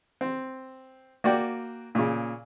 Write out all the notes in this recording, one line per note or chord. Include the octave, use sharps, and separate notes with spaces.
C4
A#3 F#4 D5 G5
A#2 C#3